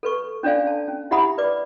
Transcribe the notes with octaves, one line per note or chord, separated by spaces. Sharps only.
A4 B4 C#6
C#4 D4 A4 D5 F5 G#5
A5
C#4
E4 G4 E5 F#5 B5 D#6
B4 D5 D6